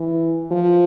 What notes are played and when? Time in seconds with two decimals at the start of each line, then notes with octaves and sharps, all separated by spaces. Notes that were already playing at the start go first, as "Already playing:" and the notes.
Already playing: E3
0.51 F3